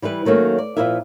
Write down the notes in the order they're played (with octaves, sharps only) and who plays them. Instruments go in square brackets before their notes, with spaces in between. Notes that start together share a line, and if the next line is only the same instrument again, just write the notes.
[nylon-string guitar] E3 G3 E4 B4
D#3 F#3 A3 A#3 C#4
D5
A#2 F3 E4 A#4 E5